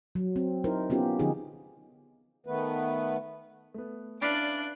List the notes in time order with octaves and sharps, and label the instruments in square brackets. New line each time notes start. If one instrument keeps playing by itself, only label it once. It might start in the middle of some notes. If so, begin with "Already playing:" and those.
[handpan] F#3
C4
D#4 E4 A#4 C5
B3 C#4 F4 G4
D3 F3 D#4 G4 G#4
[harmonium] D#3 A3 B3 B4
[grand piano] A3 B3
[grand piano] C#4 E4 [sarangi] D4 [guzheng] B4 D5 F5 [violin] F#6 D7